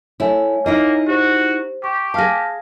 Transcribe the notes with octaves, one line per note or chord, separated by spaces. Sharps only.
A3 E4 C#5 G#5
A#3 D#4 E4 D#5
F#4 G4 C5
G4 C#6
G#4 F5 A5 F6 A#6